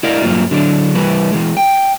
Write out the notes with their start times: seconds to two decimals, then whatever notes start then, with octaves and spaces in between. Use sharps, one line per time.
0.03 E4 A#4 D5 D#5 F5
0.23 G2 F#3 A#3 F4
0.51 D3 F#3 D4
0.95 E3 G3 B4
1.32 E3 G#3
1.57 G5